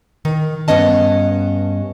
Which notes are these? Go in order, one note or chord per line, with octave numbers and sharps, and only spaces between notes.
D#3
G2 B3 C#4 D#5 A5